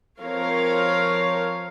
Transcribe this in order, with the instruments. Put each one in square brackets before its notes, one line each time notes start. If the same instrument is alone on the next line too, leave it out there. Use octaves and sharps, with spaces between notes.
[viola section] F3 C4 A#4 C#5 F5